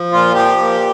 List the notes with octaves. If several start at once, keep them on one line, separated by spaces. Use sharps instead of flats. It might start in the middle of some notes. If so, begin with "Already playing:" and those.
Already playing: F3
A#2 F4
F3 G4
A#2